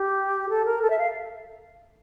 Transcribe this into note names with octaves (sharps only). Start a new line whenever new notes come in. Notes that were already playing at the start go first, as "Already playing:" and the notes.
Already playing: G4
A4
A#4
A4
E5
F5